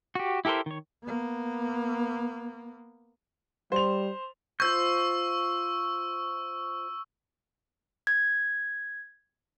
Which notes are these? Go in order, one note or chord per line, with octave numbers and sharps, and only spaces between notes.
F#4 G4
E4 G4 A4 A#4 C5
D#3 C#5
A#3 B3
G3 C5 F7
F4 C5 C#6 E6 G6
G#6